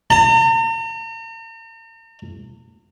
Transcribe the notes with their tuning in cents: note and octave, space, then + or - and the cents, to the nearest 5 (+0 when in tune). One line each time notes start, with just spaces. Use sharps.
A#5 -45